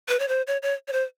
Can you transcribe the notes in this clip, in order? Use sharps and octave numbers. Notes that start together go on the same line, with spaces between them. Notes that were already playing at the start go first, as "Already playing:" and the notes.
B4
C#5
C5
C#5
C#5
C#5
C5